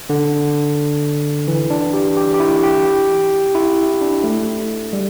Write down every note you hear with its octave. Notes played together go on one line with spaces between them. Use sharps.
D3
E3
D4
G4
G4
G4
E4
G4
E4
D4
A3
G3